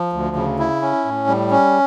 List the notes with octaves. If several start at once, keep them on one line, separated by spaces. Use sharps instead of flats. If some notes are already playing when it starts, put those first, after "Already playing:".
Already playing: F3
D2
C#3
E4
C#4
A2
G3
C#4